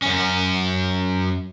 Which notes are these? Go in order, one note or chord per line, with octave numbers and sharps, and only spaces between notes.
F#2 C#4